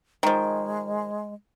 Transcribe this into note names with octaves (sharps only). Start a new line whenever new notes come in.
D#3 F3 G#3